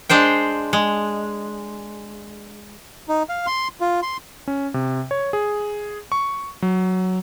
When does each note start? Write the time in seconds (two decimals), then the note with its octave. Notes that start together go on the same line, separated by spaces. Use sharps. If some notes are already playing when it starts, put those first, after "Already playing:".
0.09 G#3 D4 C5 G5
0.73 G#3
3.09 D#4
3.29 F5
3.47 C6
3.81 F4
4.02 C6
4.48 C#4
4.74 C3
5.11 C#5
5.33 G#4
6.12 C#6
6.62 F#3